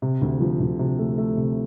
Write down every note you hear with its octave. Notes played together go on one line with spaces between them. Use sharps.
C3
D2
F3
D2
C3
A3
A3
C3